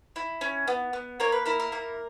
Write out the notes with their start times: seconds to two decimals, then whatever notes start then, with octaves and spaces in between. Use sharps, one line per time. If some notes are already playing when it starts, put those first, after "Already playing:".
0.16 E4
0.41 C#4
0.68 B3
0.93 B3
1.20 A#3 A#4 C#5
1.32 B4
1.46 E4 A#4
1.60 A#4
1.72 A#3 A#4